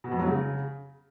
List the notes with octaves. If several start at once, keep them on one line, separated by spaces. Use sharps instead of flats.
B2
F2
F#3
C#3